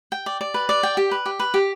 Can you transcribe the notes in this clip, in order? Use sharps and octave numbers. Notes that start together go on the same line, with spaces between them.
G5
D5
D5
B4
D5
G5
G4
B4
G4
B4
G4